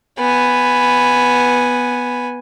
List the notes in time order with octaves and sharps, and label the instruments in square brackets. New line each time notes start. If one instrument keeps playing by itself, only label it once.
[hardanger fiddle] B3 G#5